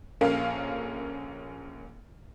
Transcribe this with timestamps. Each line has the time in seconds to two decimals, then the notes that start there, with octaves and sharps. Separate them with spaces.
0.21 A#1 A#3 C#4 A4 A#4 F5